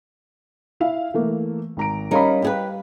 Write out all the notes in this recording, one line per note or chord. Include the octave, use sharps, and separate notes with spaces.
E4 E5 F5
E3 A3 A#3
G#1 A#5 D7
G3 C#4 D#4 A#4 F5 B5
G4 G#4 B4